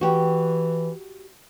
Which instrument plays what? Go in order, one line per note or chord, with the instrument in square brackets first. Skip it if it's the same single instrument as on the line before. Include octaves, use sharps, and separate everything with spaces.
[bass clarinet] E3 [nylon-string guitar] F#4 G4